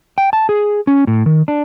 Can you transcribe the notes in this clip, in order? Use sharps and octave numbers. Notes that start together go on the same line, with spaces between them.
G5
A5
G#4
C#4
A2
D#3
D4